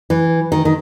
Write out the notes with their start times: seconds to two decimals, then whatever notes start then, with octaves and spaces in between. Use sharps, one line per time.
0.10 E3
0.52 D#3
0.65 D#3